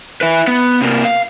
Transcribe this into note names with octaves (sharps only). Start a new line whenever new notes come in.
E4 B4
B3
C3 A#3
F5